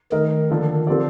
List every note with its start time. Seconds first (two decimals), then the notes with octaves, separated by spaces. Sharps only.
0.12 D#3 A3 D#4 A#4 D#5
0.50 D3 F3 A#3 D4 A4
0.87 D3 F3 C4 G4 D5